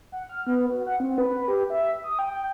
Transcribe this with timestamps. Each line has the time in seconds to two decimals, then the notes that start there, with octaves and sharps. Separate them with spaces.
0.12 F#5
0.29 F6
0.47 B3
0.70 F#4
0.86 F#5
1.00 C4
1.18 B4
1.48 G4
1.70 E5
2.04 D#6
2.19 G5